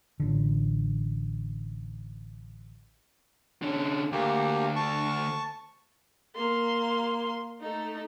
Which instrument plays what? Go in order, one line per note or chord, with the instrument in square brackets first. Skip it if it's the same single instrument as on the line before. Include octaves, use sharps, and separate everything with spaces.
[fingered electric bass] A1 D3
[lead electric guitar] D3 C#4
[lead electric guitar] D2 [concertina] A#3 G4
[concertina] A5 C#6
[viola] A#3 C6
A3 D#4